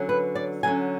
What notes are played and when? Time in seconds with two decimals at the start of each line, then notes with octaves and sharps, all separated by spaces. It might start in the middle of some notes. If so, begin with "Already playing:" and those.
Already playing: D3 F#3 C#4
0.09 B4
0.35 D5
0.63 D3 F#3 C#4 G#5